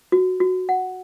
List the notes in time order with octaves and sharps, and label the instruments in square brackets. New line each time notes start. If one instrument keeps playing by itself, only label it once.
[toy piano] F#4
F#4
F#5